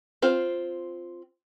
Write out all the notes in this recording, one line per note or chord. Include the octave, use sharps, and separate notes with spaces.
C4 F4 C5